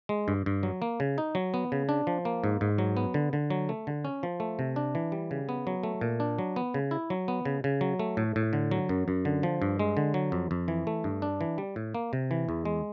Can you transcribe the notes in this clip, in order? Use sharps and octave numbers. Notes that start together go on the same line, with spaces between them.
G#3
G2
G2
F#3
A#3
C#3
D#4
F#3
B3
C#3
D4
F3
A#3
G#2
G#2
F#3
B3
D3
D3
F#3
A3
D3
C#4
F3
A3
C3
D4
E3
G3
C#3
B3
F#3
A3
A#2
D4
F#3
B3
C#3
E4
F#3
B3
C#3
C#3
F#3
A3
A2
A2
D3
F#3
F#2
F#2
D3
F3
G2
G#3
D3
F#3
F2
F2
E3
A3
G2
D4
E3
G3
A2
A#3
C3
E3
E2
G#3